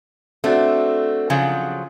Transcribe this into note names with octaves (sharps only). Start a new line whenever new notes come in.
A3 C4 D4 F#4
C#3 F3 F#3